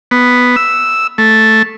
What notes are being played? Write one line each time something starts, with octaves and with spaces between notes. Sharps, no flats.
B3
E6
A3